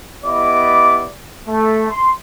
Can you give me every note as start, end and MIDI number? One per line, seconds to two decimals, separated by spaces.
0.24 1.06 59
0.24 1.06 64
0.24 1.06 67
0.24 1.06 74
0.24 1.06 75
0.24 1.06 86
1.47 1.85 57
1.89 2.10 84